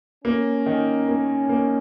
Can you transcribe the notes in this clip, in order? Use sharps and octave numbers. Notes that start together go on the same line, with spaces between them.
A#3 C#4
D#3
A#3
A#3